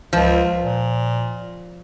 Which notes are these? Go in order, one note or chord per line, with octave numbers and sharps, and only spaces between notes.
C#2 F3
A#2